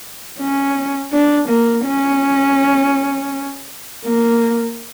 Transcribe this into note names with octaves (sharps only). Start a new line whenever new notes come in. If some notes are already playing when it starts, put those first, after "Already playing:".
C#4
D4
A#3
C#4
A#3